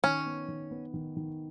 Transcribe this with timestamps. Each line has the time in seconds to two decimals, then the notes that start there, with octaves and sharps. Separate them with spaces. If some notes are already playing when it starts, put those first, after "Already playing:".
0.04 D#3 C#4
0.26 B3
0.48 D#3
0.71 B3
0.94 D#3
1.17 D#3